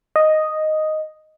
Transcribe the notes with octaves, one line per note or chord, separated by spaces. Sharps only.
D#5